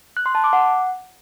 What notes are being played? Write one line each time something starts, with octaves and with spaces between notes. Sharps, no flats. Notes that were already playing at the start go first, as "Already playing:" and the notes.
F#6
C6
A5
D6
F#5